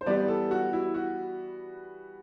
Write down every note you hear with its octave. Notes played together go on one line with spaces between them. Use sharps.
C5
E3 G3 B3 D5
A4
F#4
E4
F#4